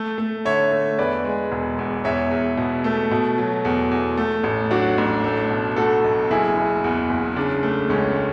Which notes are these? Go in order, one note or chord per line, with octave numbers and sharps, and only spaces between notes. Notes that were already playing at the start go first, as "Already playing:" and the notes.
Already playing: A3
A3
D3 C#5 E5
A3
E2 B4 D5
G#3
E1
E2
E2 C#5 E5
E2
B2
A3
B2
F#3
E2
E2
A3
A1
F#3 D4 F#4
A1
A3
B2
A3 F#4 A4
B1
F#1 E4 G#4
F#1
E2
F#1
C#3 D4
A3
C#2 C#4